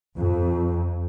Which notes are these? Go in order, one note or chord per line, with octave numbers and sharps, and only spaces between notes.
F2